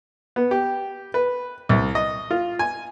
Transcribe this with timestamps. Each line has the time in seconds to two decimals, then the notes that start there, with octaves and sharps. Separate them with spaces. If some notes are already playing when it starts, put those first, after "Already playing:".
0.36 B3
0.51 G4
1.14 B4
1.69 C2
1.95 D#5
2.31 F4
2.59 G#5